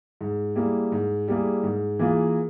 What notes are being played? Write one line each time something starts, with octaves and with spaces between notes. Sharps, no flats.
G#2
G3 A#3 E4 G#4
G#2
G3 A#3 E4 G#4
G#2
E3 A#3 F4 G#4